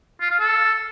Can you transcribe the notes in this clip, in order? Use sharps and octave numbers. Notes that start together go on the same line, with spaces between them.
F4
F5
A4